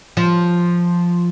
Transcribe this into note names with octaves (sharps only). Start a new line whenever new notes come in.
F3